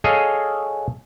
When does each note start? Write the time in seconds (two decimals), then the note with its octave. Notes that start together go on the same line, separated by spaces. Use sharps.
0.04 G#4 A4 C#5 D#5 F5 G#5